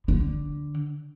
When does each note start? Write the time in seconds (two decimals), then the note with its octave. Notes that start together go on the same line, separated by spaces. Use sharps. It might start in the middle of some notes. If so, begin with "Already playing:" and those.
0.08 D3